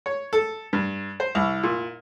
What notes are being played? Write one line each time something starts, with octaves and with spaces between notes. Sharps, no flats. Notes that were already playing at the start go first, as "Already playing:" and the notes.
C#5
A4
G2
C5
C2
A#2